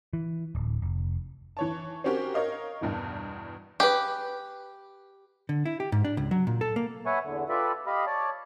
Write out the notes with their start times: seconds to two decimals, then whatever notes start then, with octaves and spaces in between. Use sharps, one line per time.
0.13 E3
0.55 D1
0.82 F1
1.57 E3 C#5 A5
2.04 C4 C#4 F#4 G4 A#4
2.34 A#4 C#5 D#5 F5
2.81 E2 G2 B2 E3
3.80 G4 G#4 B4
5.49 D3
5.66 E4
5.80 G4
5.92 G#2
6.05 D4
6.17 C#2
6.31 F#3
6.47 A#2
6.61 A4
6.76 A#3
7.06 B4 C#5 E5 F#5 G#5 C#6
7.24 E2 D3
7.49 F4 G4 A4 B4 D5 E5
7.86 G4 D#5 F5 B5
8.06 C#5 D5 A5